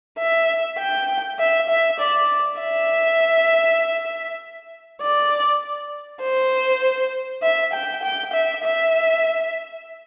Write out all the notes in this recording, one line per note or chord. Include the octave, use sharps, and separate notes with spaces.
E5
G5
E5
E5
D5
E5
D5
C5
E5
G5
G5
E5
E5